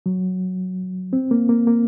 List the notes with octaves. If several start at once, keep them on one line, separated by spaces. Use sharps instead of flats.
F#3
C4
A#3
A#3
A#3